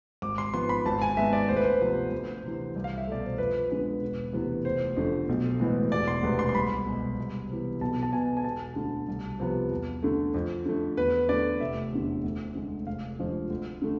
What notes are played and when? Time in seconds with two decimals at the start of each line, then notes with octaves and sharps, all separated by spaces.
0.22 G#1 D6
0.38 C6
0.54 G#2 F3 B3 C6
0.69 B5
0.85 G#1 A5
1.02 G#5
1.17 G#2 G#3 B3 E5
1.33 D5
1.49 D2 C5
1.56 B4
1.64 C5
1.81 C3 F3 B3
2.12 D2
2.44 C3 E3
2.76 C2
2.84 F5
2.97 E5
3.07 B2 A3 D5
3.25 C5
3.38 F2 B4
3.70 D3 G#3 B3 B4
4.02 E1
4.33 D2 C3 E3 B3
4.65 F1 C5
4.96 F2 D3 A3
5.29 B1
5.60 A2 E3 G#3 B3
5.92 E1 D5
6.08 C6
6.23 D2 C3 G#3 B3
6.39 C6
6.49 C6
6.55 C2 B5
6.86 B2 G#3
7.18 C2
7.50 C3 E3 B3
7.81 B1 A5
8.03 A5
8.13 B2 B3 G#5
8.37 G#5
8.44 E1 A5
8.76 D2 D3
9.08 C2
9.40 C3 F3 B3
9.71 E2
10.03 D3 A3
10.34 F2
10.66 D3 A3
10.97 E2 B4
11.29 D3 A3 D5
11.61 F1 E5
11.93 E2 D3
12.24 D2
12.55 D3 G#3
12.87 F1 F5
13.19 F2 D3 F3 G#3
13.50 D2
13.82 D3 A3